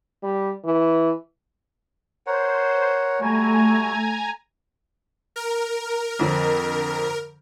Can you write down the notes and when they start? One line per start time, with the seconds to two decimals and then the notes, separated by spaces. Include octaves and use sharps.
0.23 G3
0.65 E3
2.27 A#4 C5 C#5 F#5
3.21 G3 A3 F#4 G#5 A#5 G#6
5.36 A#4
6.19 F2 D3 C4